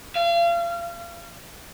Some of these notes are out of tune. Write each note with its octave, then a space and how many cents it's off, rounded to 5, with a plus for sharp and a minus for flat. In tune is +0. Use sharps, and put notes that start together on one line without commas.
F5 -35